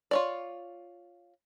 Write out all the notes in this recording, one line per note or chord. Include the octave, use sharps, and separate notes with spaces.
F4 C#5 D5